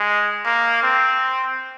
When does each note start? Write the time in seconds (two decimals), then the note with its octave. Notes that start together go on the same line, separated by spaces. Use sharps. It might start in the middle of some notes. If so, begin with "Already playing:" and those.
Already playing: G#3
0.46 A#3
0.83 C4